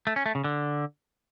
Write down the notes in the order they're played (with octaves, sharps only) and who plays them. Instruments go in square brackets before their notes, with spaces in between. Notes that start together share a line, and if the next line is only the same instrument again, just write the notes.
[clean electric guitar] A3
C#4
A3
C#3
D3